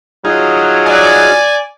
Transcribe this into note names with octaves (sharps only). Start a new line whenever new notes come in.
F#3 D#4 F4 G#4
D5 G#5